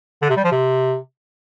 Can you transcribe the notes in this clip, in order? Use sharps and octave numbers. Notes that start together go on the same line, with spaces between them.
D3
C3
G3
F3
C3